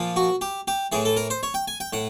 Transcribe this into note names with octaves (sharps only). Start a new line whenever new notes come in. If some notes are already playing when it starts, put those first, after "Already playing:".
Already playing: A#2 F3
F#4
G4
G4
A2 E3 G#4
A4
A#4
C5
C#5
G5
G#5
G5
A2 F#5